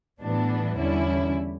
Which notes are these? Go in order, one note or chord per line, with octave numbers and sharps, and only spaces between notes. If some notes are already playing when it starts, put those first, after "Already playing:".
A2 E3 G3 B3 D4
E2 D3 G3 C#4 E4